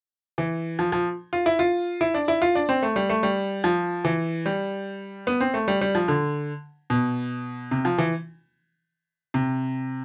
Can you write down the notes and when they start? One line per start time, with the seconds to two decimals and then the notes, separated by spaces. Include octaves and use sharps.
0.38 E3
0.79 F3
0.92 F3
1.33 F4
1.46 E4
1.59 F4
2.01 E4
2.14 D4
2.28 E4
2.42 F4
2.55 D4
2.69 C4
2.83 A3
2.96 G3
3.10 A3
3.23 G3
3.64 F3
4.05 E3
4.46 G3
5.27 B3
5.40 C4
5.54 A3
5.68 G3
5.81 G3
5.95 F3
6.08 D3
6.90 B2
7.71 C3
7.85 F3
7.98 E3
9.34 C3